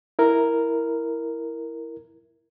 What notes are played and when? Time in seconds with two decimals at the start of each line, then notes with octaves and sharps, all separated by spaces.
0.19 E4 A#4